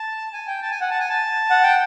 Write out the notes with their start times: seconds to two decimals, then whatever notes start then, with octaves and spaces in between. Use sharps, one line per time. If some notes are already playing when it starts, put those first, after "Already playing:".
Already playing: A5
0.33 G#5
0.47 G5
0.62 A5
0.71 G#5
0.81 F#5
0.90 A5
1.00 G#5
1.10 A5
1.50 F#5
1.63 G5